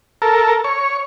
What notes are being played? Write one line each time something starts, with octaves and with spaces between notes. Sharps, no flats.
A4 A#4
C#5